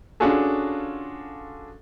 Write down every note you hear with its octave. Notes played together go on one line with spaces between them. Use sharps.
C#4 D4 F4 F#4 G#4 A4